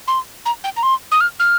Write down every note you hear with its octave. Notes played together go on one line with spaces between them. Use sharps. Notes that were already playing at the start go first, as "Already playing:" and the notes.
C6
A#5
G5
A#5
C6
D#6
F6
F6